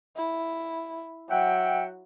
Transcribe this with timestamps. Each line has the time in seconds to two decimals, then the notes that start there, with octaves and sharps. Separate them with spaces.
0.16 E4
1.29 F#3 E5 F#5 G5